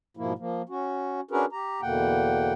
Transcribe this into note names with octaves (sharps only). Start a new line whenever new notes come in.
G#2 B2 F3 A#3 E4
F3 A#3
C#4 F#4
C#4 D4 F#4 G#4 A#4 B4
G4 A#5
E2 B2 D3 A#3 F#5 G5